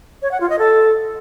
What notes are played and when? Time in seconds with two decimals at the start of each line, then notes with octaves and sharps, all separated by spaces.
0.22 C#5
0.31 F#5
0.41 F4
0.50 D#5
0.59 A4